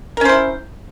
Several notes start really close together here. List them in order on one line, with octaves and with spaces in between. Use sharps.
A#4 C#4 C5 E4